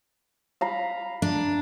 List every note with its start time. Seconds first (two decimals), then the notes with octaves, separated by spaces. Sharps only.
0.61 F5 A#5 B5
1.22 D4